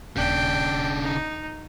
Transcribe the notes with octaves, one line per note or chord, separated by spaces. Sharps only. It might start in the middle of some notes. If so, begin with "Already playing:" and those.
D#1 C#3 D4 G5
D#4